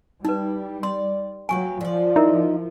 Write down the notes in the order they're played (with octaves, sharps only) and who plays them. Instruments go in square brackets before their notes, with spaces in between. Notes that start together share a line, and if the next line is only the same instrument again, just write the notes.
[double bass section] G3 [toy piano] D#4 B4 [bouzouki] E4
[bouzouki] D5 [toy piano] C6
[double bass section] F#3 [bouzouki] A#3 G4 B4 [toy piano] G#5 C#6
[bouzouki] D3 D5 [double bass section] F3
[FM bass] D#4 [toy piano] E4 A#4 E5